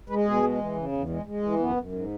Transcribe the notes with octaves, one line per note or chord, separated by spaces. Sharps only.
G#3 B4
B2 G#4
G#3
E3
C#3
E2
G#3
G#3
E3
F#2 B3
F#2
G#2